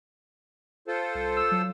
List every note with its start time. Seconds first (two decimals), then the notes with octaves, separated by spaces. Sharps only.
0.88 F4 A4 C5
1.15 C2
1.36 E6
1.51 F#3